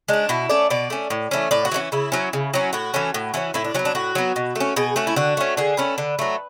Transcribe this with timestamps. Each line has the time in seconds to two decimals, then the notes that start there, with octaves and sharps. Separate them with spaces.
0.08 G#3 C#4 D4
0.29 B2 E4
0.50 A3 C#4 D5
0.70 B2 D5
0.90 A3 C#4
1.10 A2
1.31 E3 A3 C#4
1.51 A2 D5
1.65 F#4
1.72 E3 A3 C#4
1.92 C#3 E4
2.12 F#3 C#4
2.33 C#3
2.54 F#3 C#4
2.73 A2 F#4
2.94 E3 A3 C#4
3.14 A2
3.34 E3 A3 C#4
3.54 A2 E4
3.64 D4
3.74 F#3 C#4
3.79 B3
3.85 D4
3.95 A2 F#4
4.15 F#3 B3
4.36 B2
4.55 A3 C#4
4.76 B2 G#4
4.96 A3 C#4 F#4
5.07 E4
5.16 D3 F#4
5.37 A3 C#4
5.57 D3 G#4
5.77 A3 C#4 B4
5.98 D3
6.19 F#3 A3